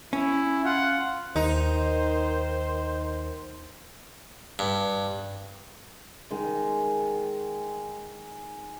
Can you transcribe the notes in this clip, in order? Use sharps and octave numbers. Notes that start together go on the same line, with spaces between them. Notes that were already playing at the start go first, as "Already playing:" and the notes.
C#4 E4
F4 F#5
D#2 D#3 D#4 C5
G2
D#3 G#3